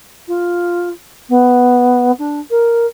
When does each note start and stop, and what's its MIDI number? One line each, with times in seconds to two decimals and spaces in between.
0.28 0.89 65
1.29 2.11 59
2.19 2.40 62
2.50 2.86 70